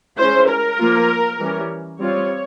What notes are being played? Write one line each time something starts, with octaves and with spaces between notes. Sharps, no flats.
G#3 C#4 E4 C5
A#4
F3 A#3 F4
E3 G3 C#4
G3 C4 F4 C#5